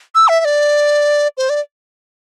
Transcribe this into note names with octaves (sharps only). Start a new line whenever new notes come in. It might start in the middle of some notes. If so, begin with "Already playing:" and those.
E6
E5
E5
D5
C5
D5